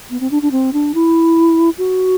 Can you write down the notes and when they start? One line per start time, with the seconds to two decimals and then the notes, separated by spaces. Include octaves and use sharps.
0.10 B3
0.20 C4
0.31 D4
0.42 D4
0.51 C4
0.73 D4
0.94 E4
1.78 F#4